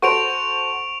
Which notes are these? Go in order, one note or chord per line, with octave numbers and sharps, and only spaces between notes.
F#4 A4 C5 C#6 D7 F7